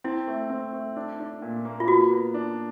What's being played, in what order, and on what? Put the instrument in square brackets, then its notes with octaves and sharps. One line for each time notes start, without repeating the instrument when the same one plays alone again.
[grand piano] C4 [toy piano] E4
[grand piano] A3
C4
A3
D4
D4
A#2
A#3
[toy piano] F4
[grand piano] B3 [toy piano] F#4
[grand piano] B3
D4